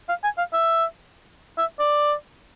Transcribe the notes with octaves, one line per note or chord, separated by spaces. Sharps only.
F5
G#5
F5
E5
E5
D5